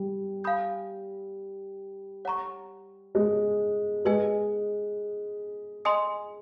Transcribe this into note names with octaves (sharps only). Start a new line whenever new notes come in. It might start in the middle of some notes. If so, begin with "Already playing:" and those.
Already playing: G3
F5 G#5 B5 D#6 G6
C#5 F#5 A#5 C#6
G#3
G#3 B4 D#5 G#5
D#5 G#5 C6 D#6